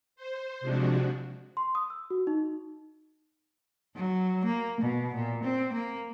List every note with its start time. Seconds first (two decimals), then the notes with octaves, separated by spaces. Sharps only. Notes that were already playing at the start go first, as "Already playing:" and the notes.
0.16 C5
0.61 C3 F3 G#3 D4 F#4
1.57 C6
1.75 D#6
1.90 E6
2.10 F#4
2.27 D#4
3.95 F#3
4.44 A#3
4.81 B2
5.14 A#2
5.43 C4
5.72 A#3